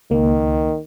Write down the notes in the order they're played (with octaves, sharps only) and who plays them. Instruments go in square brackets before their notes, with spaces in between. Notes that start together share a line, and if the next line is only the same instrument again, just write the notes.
[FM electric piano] C#2 A#3 [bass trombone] D#3